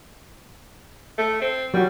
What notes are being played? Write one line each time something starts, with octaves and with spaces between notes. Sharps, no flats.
A3
C4
F#3 G3 F#4